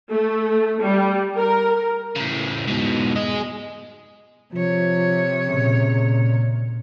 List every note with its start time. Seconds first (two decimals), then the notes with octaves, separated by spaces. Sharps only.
0.12 A3
0.83 G3
1.37 A#4
2.16 A2 C#3
2.68 G#2 B2
3.16 G#4 D#5
4.53 C3 F3 C#5
5.48 A#2 C#3